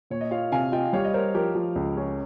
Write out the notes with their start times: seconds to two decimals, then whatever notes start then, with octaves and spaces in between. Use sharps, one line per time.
0.10 A#2 C#5
0.21 D#5
0.31 F4 C#5 F5
0.52 C3 F5 G#5
0.72 F4 D#5 G5
0.93 G3 C#5 F5
1.05 D#5
1.14 A#4 C5 C#5
1.35 F3 G4 A#4
1.55 F3
1.76 C#2
1.97 C#4